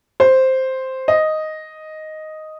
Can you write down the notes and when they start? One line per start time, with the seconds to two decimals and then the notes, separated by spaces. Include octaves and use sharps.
0.20 C5
1.08 D#5